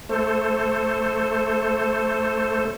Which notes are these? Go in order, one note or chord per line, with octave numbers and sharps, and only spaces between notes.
A3 A4 C5